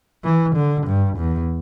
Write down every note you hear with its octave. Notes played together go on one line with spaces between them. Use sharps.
E3
D3
G2
E2